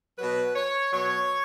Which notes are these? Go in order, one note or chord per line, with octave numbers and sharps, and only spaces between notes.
B2 F#3 B4
C#5
B2 F#3 C#5